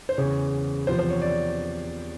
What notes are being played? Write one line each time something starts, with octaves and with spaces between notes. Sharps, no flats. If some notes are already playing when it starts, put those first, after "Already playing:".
C5
E2 C#3 E3 C#5
E2 C3 F3 C5
C5
C#5
D5